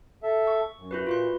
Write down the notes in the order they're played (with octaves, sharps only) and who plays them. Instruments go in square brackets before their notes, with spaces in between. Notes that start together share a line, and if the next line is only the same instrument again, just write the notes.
[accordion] A4 E5
[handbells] C#6
[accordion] F#2
[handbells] E4 F#4 B4
[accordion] A#2 [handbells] F4 B4 C6